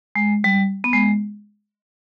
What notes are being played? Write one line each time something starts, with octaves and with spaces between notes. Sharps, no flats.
G#3
G3
B3
G#3